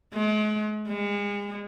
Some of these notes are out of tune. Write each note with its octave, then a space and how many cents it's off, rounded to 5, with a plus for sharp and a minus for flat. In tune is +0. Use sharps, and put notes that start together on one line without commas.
G#3 +40
G#3 -35